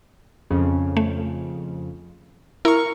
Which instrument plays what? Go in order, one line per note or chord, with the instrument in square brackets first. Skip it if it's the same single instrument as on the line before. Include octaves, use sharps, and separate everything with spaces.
[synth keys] F2 C#3
[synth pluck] A3
[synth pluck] E4 [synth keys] A#4 C#6